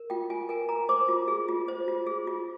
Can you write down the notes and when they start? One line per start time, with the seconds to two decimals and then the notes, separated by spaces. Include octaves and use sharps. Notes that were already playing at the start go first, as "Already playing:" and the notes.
Already playing: A#4
0.10 F4 G5
0.30 F4 G#5
0.49 A#4 G#5
0.69 A#4 A#5
0.89 C5 D6
1.08 F4
1.28 G#4
1.48 F4
1.68 C5
1.88 F4
2.07 G#4
2.27 F4